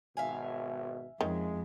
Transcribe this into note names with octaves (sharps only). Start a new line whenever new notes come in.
G#1 B2 E5 F5 G#5
F2 D#3 G#3 C#4